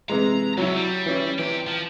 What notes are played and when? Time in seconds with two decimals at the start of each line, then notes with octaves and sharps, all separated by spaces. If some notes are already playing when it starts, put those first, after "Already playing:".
0.09 C3 E3 G#3 A#5
0.58 C#2 C3 F#3 E4
0.76 G3
1.06 E3 C#4 E4
1.39 C3 E3 G4
1.67 F3